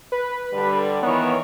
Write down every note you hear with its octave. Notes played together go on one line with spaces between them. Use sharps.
B4
D3 G3
D#3 E3 B3 C#5